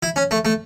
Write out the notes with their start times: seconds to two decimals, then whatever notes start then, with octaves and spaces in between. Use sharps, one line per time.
0.03 E4
0.16 C#4
0.31 A3
0.45 A3